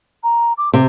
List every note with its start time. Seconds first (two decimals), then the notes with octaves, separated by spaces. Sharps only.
0.23 A#5
0.58 D6
0.73 C3 G4